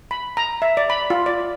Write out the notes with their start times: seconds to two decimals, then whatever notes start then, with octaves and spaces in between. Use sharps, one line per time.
0.11 B5
0.37 A#5
0.62 E5
0.77 D5
0.90 B5
1.10 F4
1.26 D5